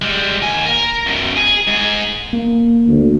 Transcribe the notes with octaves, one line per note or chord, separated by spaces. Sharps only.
G3 G#3
D#2 G#5
A#4
F#2 B2
G#4
G#2 G#4
A#3
D2